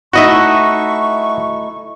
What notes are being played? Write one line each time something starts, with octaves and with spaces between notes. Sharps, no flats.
A3 D#4 E4 F#4 D#5 E5 C#6